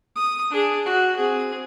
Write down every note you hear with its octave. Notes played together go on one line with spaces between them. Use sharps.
D#6
D4 G#4
F#4
C4 G#4